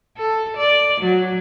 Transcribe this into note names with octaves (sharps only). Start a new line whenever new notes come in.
A4
D5
F#3